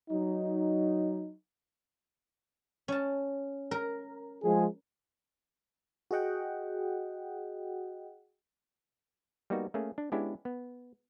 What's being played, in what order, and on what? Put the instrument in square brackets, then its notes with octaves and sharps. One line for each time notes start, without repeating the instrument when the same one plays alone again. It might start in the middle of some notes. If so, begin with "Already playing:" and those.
[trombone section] F#3 D#4
[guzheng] C#4 A5
A#4
[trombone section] F3 G#3 G#4
[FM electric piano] F#4 G#4 D#5 F#5 G5
[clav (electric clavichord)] G3 A#3 B3 D#4 F#4
A3 A#3 C#4 G#4
D4
G#3 B3 C#4 D4 E4 G4
B3